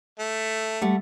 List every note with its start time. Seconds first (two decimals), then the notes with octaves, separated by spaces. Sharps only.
0.20 A3
0.81 G3 A3 F#5